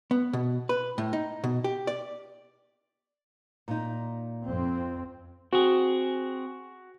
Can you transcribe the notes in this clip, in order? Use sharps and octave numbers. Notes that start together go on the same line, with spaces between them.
B3
B2
B4
A2
D#4
B2
G4
D5
A#2 D#4
F2 C4
C4 F#4 G#4